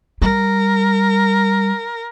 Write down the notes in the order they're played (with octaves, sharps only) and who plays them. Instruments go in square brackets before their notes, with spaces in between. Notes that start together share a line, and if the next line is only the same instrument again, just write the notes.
[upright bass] G3 [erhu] A#4